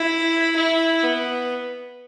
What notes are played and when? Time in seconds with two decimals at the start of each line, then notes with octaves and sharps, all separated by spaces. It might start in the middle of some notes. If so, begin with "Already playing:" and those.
Already playing: E4
0.56 E4
1.03 B3